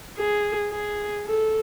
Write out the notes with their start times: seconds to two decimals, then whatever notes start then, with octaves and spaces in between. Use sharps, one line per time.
0.18 G#4
0.71 G#4
1.25 A4